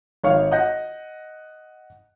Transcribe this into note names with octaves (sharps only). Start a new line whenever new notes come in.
G#1 C#5 F5 C#6
D#5 F#5 G6 A#6